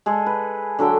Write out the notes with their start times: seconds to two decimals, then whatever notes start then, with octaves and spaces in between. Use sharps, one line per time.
0.06 G#3 G#4 A4
0.26 B4
0.79 D3 F#3 A4 G5